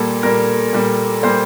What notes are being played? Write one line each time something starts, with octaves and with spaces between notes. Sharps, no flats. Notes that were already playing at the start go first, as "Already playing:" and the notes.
Already playing: A#2 G3 A#3 A4
A#2 G3 A#3 A#4
A#2 G3 A#3
A#2 G3 A#3 C5